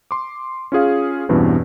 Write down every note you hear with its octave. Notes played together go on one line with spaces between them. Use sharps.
C6 D6
C#4 F4 G#4 F5
E2 G2 B2 E3 C4 C#4